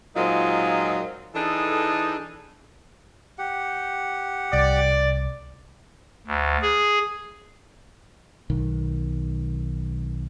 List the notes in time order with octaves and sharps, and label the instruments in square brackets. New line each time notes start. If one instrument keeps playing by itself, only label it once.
[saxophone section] A#2 F#3 G#3 C4 D#4 F4
E3 D4 D#4 G#4 A4
[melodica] G4 F#5
[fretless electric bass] C2 [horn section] D5
[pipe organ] D2
G#4
[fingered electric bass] B1 D#3